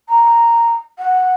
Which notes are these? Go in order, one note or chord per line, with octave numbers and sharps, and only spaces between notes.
A#5
F#5